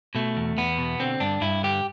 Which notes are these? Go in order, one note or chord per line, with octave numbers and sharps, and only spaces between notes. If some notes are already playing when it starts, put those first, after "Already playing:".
B2 A3
E2
E2 B3
B2
D3 C4
G2 D4
G2 E4
D3 G4